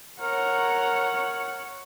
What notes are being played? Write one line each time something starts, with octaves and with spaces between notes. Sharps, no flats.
A#4 C#5 F#5